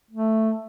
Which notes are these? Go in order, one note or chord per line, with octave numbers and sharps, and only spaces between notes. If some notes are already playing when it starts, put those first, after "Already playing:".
A3